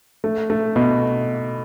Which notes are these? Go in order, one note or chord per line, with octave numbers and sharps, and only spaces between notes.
A3
A3
B2